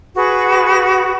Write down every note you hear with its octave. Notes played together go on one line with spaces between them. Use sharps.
F#4 G#4 B4